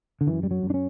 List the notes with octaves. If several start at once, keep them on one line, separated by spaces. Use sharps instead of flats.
D3
F#2 E3
G3
F#3
F#2
D4
C#4